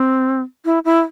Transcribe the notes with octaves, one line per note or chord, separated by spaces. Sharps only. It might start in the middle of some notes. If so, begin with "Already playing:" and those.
Already playing: C4
E4
E4